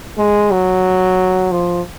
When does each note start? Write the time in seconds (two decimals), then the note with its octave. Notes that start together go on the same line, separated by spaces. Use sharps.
0.18 G#3
0.51 F#3
1.52 F3